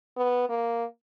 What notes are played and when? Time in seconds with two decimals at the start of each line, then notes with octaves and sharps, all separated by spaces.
0.17 B3
0.49 A#3